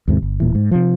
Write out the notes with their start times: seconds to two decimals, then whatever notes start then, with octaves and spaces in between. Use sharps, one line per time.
0.08 D#2 G#2 C3
0.22 G1
0.40 D#1 A#2 E3
0.55 G#2
0.71 C3 F3